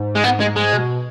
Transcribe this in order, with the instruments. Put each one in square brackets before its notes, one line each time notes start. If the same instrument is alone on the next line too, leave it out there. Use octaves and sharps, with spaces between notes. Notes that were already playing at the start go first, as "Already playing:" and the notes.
Already playing: [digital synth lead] G#2
[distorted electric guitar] G#3
B3
G#3
G#3
[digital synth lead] B2